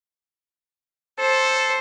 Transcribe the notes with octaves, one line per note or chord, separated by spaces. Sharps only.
A4 C5